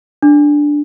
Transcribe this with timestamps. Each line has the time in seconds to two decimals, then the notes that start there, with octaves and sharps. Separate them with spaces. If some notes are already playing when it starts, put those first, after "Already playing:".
0.22 D4